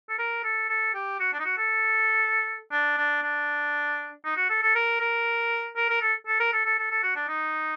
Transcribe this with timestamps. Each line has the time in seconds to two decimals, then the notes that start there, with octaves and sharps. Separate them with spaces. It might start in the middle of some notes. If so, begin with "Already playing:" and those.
0.09 A4
0.19 A#4
0.44 A4
0.69 A4
0.94 G4
1.20 F#4
1.33 D4
1.39 D#4
1.45 F#4
1.58 A4
2.72 D4
2.98 D4
3.23 D4
4.25 D#4
4.36 F#4
4.50 A4
4.62 A4
4.75 A#4
5.00 A#4
5.76 A#4
5.90 A#4
6.02 A4
6.27 A4
6.40 A#4
6.53 A4
6.65 A4
6.78 A4
6.91 A4
7.03 F#4
7.16 D4
7.28 D#4